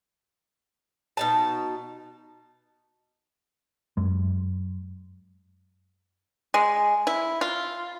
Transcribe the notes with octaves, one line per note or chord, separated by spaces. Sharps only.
B2 D#4 A5
F#2 G#3
G#3
E4
F4